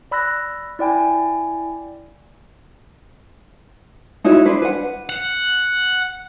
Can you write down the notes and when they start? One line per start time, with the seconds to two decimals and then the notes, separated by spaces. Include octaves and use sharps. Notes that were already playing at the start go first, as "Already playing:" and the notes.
0.11 D5 B5 E6 F#6 A#6
0.79 E4 D5 G5 G#5
4.24 D#4 E4 F#4 C#5
4.45 D4 B4 C5
4.62 B4 F#5
5.09 F#5